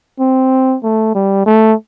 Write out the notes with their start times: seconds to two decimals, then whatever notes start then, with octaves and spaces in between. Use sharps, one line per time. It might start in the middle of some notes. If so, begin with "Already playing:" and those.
0.20 C4
0.83 A3
1.15 G3
1.46 A3